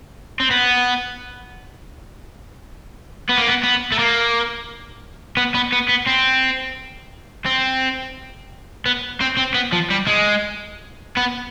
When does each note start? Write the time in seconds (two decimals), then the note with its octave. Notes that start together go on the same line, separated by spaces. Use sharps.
0.40 C4
0.51 B3
3.29 B3
3.37 A#3
3.47 B3
3.63 B3
3.92 A3
3.99 A#3
5.37 B3
5.55 B3
5.73 B3
5.89 B3
6.07 C4
7.46 C4
8.86 B3
9.21 C4
9.37 C4
9.54 B3
9.73 F3
9.90 G3
10.07 G#3
11.17 B3